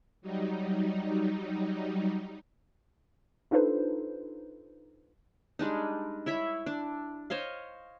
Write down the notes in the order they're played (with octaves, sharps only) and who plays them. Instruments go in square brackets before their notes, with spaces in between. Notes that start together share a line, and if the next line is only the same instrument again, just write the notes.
[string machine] F#3 G3 D#4
[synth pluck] D4 D#4 F4 A4 B4 C5
[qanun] G3 G#3 D4 D#4
E4 C#5 E5 B5
D4
C5 C#5 D#5 F5